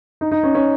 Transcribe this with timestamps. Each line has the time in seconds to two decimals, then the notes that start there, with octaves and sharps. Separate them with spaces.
0.21 D#4
0.31 D#4
0.43 C#4
0.55 C#4